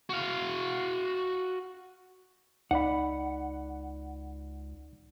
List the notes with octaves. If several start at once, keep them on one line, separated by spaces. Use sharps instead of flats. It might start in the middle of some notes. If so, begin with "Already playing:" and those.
F#4 F5
C#2 D#4 D5 F#5 B5